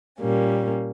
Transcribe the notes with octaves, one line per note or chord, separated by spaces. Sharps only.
A#2 G3 A#3 C#4